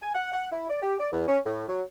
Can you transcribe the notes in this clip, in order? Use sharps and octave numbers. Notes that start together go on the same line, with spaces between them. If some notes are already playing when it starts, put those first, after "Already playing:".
G#5
F#5
F#5
E4
D5
G4
D5
E2
C#4
A2
F#3